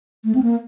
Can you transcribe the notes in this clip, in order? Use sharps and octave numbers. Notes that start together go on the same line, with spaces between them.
A3
C4
A#3